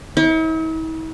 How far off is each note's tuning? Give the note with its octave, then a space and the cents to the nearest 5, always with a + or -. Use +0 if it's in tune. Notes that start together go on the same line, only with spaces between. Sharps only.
E4 -45